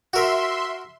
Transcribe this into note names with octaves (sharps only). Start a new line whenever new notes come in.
F#4 A#4 E5 C6